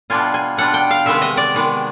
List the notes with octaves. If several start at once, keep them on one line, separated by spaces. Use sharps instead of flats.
B2 G3 B3 D4 F4 G#5
G#5
B2 G3 B3 D4 F4 F#5
G5
F5
C3 D#3 G#3 B3 E5
D#5
D5
C3 D#3 G#3 B3